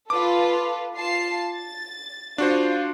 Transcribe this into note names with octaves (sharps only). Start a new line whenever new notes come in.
F4 A4 B4 D6
F4 A5 C7
A6
D4 F4 F#4 C5